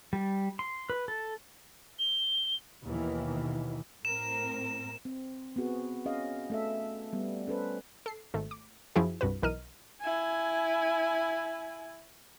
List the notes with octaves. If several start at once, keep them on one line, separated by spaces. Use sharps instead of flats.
G3
C6
B4
A4
G7
D#2 B2 D#3 E3
A2 C4 A#4 E7
C4
B3 C4 F#4 G#4
C#4 G#4 D#5 F5
A3 A4 E5
G3 B3
C#4 A4 B4 C5
A4 C7
G#1 A3
D6
F#2 F3 E4 F#4 G#4
C2 G2 F#4 B4
B1 E3 A#4 D#5 F6 D#7
E4 G#5